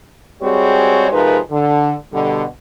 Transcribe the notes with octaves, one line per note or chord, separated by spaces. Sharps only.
G3 G#3 C4 F#4 G#4 C#5
C3 F3 G#3 D#4 A#4 B4
D3
B2 D3 G3